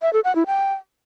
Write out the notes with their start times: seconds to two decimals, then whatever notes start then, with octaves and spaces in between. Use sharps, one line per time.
0.02 E5
0.13 A4
0.24 F#5
0.35 E4
0.47 G5